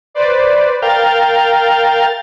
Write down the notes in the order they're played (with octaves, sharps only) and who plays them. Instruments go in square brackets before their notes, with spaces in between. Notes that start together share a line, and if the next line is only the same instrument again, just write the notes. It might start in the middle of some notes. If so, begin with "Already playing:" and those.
[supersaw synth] B4 C5 D5
[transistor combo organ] A#4 F5 G5 [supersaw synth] A6